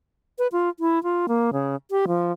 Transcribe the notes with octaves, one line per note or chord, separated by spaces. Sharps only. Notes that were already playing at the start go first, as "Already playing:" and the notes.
B4
F4
E4
F4
A#3
C#3
G4
F3